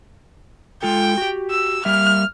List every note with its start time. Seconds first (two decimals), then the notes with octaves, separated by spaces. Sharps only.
0.83 G#3 F4 A4 G5
1.18 F#4 G4
1.51 E6
1.85 G3 A#3 E5 F6